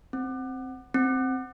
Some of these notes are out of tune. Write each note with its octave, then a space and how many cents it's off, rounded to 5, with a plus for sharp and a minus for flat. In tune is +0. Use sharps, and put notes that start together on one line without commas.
C4 +0
C4 +0